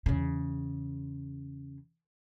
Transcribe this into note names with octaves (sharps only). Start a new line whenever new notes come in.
E2 C#3